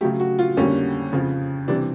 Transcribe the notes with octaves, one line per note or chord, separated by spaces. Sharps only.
C#3 F#3 A3 G4
F#4
F4
F2 D3 G3 A#3 C#4
F2 C#3 F3
C3 E3 G3 D4